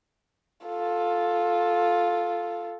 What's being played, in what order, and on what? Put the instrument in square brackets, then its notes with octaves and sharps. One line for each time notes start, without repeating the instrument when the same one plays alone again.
[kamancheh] F4 A4